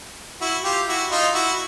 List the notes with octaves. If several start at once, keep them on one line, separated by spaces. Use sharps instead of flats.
E4 F#4
F4 G4
E4 F#4
D#4 F4
E4 F#4